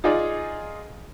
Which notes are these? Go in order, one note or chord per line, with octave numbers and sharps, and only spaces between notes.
D#4 F4 G#4 D5